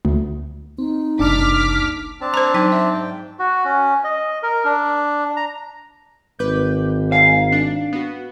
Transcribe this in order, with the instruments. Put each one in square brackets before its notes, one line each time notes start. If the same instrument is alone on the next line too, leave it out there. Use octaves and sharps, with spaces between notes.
[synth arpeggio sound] D2
[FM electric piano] C4 [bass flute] D#4
[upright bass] F#1 C2 [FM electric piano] D4 A5 [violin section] D6 F6 B6
[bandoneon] C4 D4 A5
[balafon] C5 A#5
F#3 D#4 G5
E5
[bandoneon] G#2 G5
[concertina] F#4
C#4
D#5
A#4
D4
A#5
[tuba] G#1 [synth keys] B4 D6 G6
[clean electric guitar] F5 [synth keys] G#5 A#5
[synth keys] D4
B3 F#4